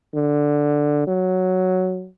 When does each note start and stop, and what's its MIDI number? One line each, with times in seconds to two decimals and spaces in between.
0.15 1.05 50
1.08 2.07 54